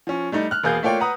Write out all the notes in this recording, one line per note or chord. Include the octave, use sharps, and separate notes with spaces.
F3 C#4
G3 A3 D#4
F6 F#6
E1 A#3 G#4 F5 G6
A3 A#3 F4 C#5 D5 G5
B4 F#5 A#5 D#6